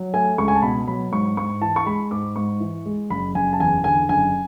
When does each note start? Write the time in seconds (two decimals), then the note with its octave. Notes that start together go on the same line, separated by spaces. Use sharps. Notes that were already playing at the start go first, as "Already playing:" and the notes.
Already playing: F#3
0.14 A3 G#5
0.38 C#2 C#6
0.48 G#5
0.56 A5
0.62 B2 B5
0.88 F#3 B5
1.12 G#2 C#6
1.37 G#2 C#6
1.61 E3 A5
1.76 C#6
1.86 G#3 B5
2.11 G#2 D6
2.36 G#2 C#6
2.60 E3
2.86 G#3
3.10 F#1 B5
3.35 F#1 G#5
3.53 A5
3.60 E2 G#5
3.84 D3 G#5
4.09 F#1 G#5